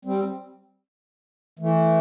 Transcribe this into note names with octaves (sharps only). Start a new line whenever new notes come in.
G3 C4
E3 A3